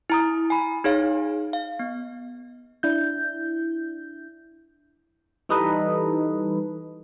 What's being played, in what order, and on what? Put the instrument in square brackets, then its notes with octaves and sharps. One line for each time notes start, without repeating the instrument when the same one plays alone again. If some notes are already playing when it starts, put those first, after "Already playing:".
[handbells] E4 A#5 D#6
G#5 B5
D#4 G#4 C#5 F5
F5
B3
[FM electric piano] D4 E4 G6
E3 G3 D#4 A4 B4 D#5